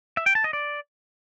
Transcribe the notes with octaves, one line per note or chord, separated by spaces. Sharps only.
E5
G5
A5
D#5
D5